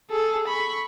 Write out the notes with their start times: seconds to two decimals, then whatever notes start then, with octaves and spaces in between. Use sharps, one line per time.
0.10 G#4 A4
0.48 B5 C#6